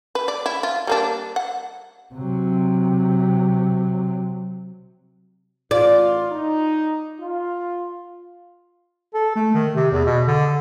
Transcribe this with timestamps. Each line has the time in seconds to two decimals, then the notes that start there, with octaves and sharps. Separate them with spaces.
0.15 B4
0.28 D5
0.46 E4
0.63 F4
0.87 G3 A#3 D4
1.36 F#5
2.15 C3 F#3
5.71 A1 F4 D5
6.31 D#4
7.20 F4
9.14 A4
9.35 A3
9.54 D#3
9.75 C3
9.91 E2
10.05 B2
10.27 D3